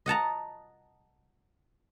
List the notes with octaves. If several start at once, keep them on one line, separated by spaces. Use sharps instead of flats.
D#5 F#5 A5 A#5